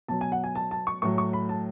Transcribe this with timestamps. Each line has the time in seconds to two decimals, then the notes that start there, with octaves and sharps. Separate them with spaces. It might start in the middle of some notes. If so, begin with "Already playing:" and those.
0.08 B2 F#3 A5
0.21 G#5
0.32 F#5
0.44 G#5
0.55 A5
0.71 A5
0.87 C#6
1.02 A2 F#3 C#6
1.18 C#6
1.33 B5
1.49 A5